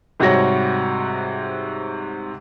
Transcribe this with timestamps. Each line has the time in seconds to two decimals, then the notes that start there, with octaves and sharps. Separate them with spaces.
0.20 G#2 C3 G3 F#4 C#5 A#6